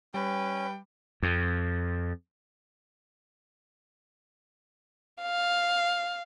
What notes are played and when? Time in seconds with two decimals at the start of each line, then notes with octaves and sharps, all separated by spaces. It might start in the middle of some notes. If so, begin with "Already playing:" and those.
0.14 G3 C#4 B4 G5
1.23 F2
5.21 F5